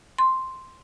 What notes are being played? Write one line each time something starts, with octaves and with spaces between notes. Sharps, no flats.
C6